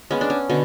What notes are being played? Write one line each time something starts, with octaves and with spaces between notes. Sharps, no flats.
G#3 B3 C#4
D4
C#4
B2 D3